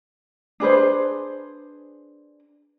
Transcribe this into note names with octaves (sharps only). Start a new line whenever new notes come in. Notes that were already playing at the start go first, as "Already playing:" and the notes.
D4 G#4 B4 C5